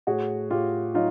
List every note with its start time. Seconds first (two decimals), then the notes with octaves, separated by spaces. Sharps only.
0.07 A2 F#4 G#4
0.50 A2 F4 G4
0.94 F#3 D#4 F4